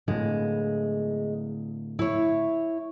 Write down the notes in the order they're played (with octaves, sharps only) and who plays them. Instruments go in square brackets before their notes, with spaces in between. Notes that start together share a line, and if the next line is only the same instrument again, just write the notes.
[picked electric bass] A2 D3 [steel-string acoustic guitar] G#3
[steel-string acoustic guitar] E4 C#5